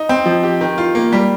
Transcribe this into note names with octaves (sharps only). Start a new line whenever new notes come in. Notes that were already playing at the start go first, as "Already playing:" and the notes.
Already playing: D#4
C4
F3
G4
D#3
F4
A#3
G3